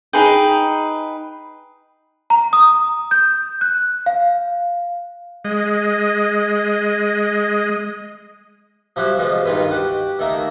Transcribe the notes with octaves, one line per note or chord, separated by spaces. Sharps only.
D#4 G#4 B4 G5
A#5
D#6
G6
F#6
F5
G#3 D#5
F3 G3 E4 F#4
E2 B2 F3 G#3
G2 D#3 F4 B4
F#4 G4 F#5
D#3 A3 A#3